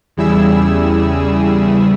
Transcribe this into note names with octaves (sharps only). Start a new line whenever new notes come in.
E2 C#3 G3 E4 G#4 E6